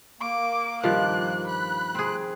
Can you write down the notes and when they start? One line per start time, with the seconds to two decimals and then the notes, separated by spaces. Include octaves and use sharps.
0.21 A#3 D6
0.84 G2 D#3 F3 F#6
1.48 B5 F#6
1.95 C4 G#4